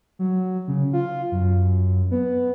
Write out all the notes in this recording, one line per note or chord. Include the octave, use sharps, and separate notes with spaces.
F#3
C#3
F4
F#2
B3